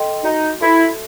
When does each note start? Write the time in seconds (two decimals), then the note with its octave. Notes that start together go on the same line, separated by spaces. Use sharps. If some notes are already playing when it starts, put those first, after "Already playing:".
Already playing: A4 D#5 G5 C6
0.24 D#4 F#4
0.60 E4 A4 E5 A5 C6